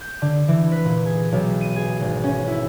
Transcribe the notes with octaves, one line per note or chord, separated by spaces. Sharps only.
G6
D3
E3
B4
A#2
G#4
B1
D#7
G#4
G#1
C#4
E4